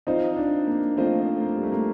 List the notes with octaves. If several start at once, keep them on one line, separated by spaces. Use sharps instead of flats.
F3 C4 D#4 F4 C5 D#5
D4
A#3
F3 A3 C4 F4 C5 D#5
A#3
G3
A3
A#3